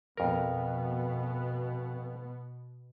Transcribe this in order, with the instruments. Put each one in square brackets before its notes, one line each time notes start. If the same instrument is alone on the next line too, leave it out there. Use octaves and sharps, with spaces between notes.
[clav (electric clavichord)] F2 A#4 [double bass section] B2 B3